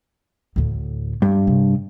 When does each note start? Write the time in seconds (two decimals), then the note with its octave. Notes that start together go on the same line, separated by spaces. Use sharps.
0.56 D2 A2
1.22 G2
1.47 C3